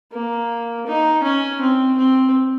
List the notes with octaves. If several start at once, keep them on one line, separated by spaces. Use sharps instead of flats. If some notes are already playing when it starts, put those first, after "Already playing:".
A#3
D#4
C#4
C4
C4